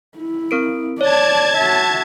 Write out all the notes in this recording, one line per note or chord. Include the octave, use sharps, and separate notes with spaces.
E4
C4 A#4 D7
C#5 D5 A5 G#6
F#4 E5